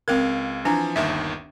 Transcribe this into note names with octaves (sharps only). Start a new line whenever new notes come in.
C#2 C4 A#4 F5 G#6
E3 F3 D4 G#5 A#5
G1 D#2 D#3 E5